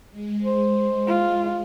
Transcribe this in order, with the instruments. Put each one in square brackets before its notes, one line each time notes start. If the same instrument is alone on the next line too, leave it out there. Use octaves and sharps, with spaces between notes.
[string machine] G#3
[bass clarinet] C5
[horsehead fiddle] F4